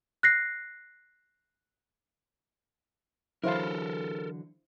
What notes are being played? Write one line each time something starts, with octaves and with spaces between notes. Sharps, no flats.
F#6 A#6 C7
D3 E3 F#3 E4 A4 A#4 C5 F5